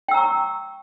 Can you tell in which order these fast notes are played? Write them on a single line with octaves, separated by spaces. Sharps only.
G5 E6 A#5 C#6